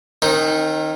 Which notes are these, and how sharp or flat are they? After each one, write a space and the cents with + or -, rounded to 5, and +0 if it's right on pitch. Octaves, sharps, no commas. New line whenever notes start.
D#3 +0 C4 +45 D#4 +0